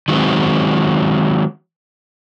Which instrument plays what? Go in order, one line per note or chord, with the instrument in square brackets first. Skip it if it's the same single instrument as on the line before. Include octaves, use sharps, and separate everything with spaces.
[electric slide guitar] D#3 F#3 G#3 B3 C4